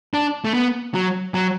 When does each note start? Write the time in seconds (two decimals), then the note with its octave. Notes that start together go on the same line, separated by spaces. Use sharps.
0.14 D4
0.45 A3
0.54 B3
0.94 F#3
1.34 F#3